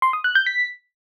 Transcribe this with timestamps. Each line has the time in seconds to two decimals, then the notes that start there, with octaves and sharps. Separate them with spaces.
0.02 C6
0.13 D#6
0.24 F#6
0.35 G6
0.46 B6